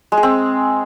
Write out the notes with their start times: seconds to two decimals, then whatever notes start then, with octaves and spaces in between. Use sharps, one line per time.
0.12 G#3
0.17 G#4
0.23 C4